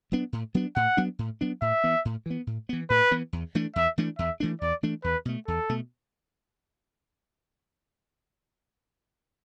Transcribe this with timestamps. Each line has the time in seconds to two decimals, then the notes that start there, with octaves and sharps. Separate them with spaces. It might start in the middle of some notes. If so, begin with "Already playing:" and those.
0.12 F#3 B3 D4
0.33 A2
0.54 F#3 B3 D4
0.76 A2 F#5
0.97 F#3 B3 D4
1.19 A2
1.41 F#3 B3 D4
1.61 A2 E5
1.84 E3 B3
2.05 A2
2.26 E3 B3
2.47 A2
2.69 E3 B3
2.90 A2 B4
3.11 E3 B3
3.33 E2
3.55 E3 A3 D4
3.76 E2 E5
3.98 E3 A3 D4
4.19 E2 E5
4.40 E3 A3 D4
4.61 E2 D5
4.83 E3 A3 D4
5.04 E2 B4
5.25 B2 A3
5.48 E2 A4
5.69 B2 A3